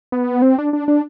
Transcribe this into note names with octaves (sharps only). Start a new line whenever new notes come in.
B3
C4
D4
D4
D4